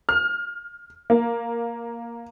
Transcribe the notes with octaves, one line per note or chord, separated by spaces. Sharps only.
F6
A#3